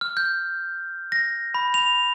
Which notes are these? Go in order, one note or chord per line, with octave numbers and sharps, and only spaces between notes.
F6
G6
A#6
B5
F7